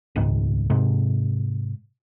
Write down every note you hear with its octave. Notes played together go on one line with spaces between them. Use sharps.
D#1 C#2 G#2
G#2 C3